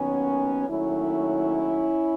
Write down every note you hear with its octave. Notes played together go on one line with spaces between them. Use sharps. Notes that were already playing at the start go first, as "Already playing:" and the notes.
Already playing: D#2 D#3 F#3 B3 C#4
D#2 D#3 F#3 A3 C#4 E4